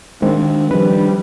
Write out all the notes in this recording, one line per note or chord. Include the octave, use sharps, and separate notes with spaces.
D#3 G#3 C4 D4
D#3 F3 G3 D4 B4